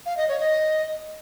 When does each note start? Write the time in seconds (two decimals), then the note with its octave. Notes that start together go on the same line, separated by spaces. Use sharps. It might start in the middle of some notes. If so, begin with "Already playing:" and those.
0.06 F5
0.17 D#5
0.28 C#5
0.40 D#5